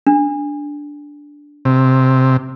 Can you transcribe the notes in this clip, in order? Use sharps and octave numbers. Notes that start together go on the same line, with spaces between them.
D4
C3